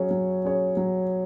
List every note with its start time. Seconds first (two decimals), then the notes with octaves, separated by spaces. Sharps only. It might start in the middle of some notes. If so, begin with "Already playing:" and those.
Already playing: F#3 C#4 G#4 C#5
0.11 F#3
0.45 C#4 G#4 C#5
0.77 F#3